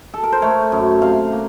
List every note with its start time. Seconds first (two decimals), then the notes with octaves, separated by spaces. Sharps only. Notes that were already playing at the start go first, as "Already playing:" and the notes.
0.14 A4
0.23 A#4
0.32 C5
0.42 A3 C#5
0.72 F#2
1.02 C3 F5
1.32 A#3